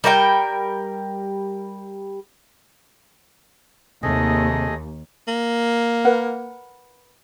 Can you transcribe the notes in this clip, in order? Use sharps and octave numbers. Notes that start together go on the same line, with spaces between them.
G3 A#4 C#5 G5
D#2 C3 A3 G#4 D#5
A#3
A#4 B4 F#5